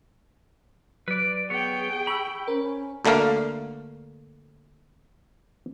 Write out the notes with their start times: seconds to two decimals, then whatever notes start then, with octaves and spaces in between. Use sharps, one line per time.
1.08 F#3 B4 D5
1.50 B3 G#4 C#5 G5
2.07 B5 C#6 E6
2.48 C#4 A#4 C5
3.05 D2 D3 A3 A#3 F5